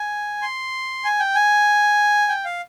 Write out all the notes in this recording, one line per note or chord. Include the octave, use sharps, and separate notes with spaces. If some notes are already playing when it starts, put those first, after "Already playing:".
Already playing: G#5
C6
G#5
G5
G#5
G5
F5